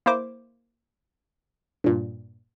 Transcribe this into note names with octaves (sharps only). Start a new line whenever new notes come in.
A#3 E4 C5 D6
G2 A#2